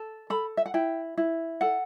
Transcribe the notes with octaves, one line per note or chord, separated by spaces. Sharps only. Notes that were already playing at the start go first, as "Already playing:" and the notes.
Already playing: A4
A4 B5
E5
F#5
E4 G5
E4
A4 F#5